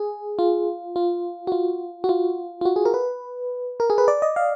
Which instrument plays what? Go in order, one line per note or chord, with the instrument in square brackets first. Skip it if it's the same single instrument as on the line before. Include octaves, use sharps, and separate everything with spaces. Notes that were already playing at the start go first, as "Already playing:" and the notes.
Already playing: [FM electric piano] G#4
F4
F4
F#4
F4
F#4
F4
F4
F#4
G#4
A#4
B4
A#4
G#4
B4
D5
D#5
F5